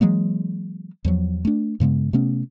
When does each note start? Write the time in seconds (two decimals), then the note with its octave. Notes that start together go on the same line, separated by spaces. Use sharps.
0.01 E3 F#3 G#3 A#3
1.05 E2 F3 F#3
1.45 A3 D4
1.80 G2 C#3 G#3 B3
2.13 C3 A3 B3 C#4